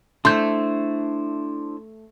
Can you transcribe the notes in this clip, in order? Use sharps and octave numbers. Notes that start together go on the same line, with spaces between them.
A3 D4 E4 C5 C6 G6